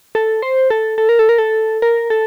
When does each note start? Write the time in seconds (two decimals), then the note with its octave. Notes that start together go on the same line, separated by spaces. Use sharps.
0.15 A4
0.42 C5
0.70 A4
0.98 A4
1.09 A#4
1.19 A4
1.29 A#4
1.38 A4
1.82 A#4
2.10 A4